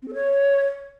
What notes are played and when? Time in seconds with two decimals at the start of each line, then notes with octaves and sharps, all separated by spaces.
0.02 C4
0.08 A4
0.14 C#5